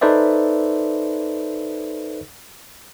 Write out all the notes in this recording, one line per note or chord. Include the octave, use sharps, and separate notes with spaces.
D#4 A4 B4 C5 D5 E5